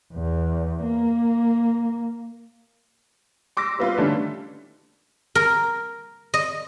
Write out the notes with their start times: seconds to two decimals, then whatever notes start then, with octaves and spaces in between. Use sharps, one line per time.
0.14 E2
0.83 A#3
3.57 C6 D6 E6 A#6
3.79 G3 B3 F4 B4
3.98 D3 D#3 G3 A3 C#4 D4
5.35 A#4
6.34 D#5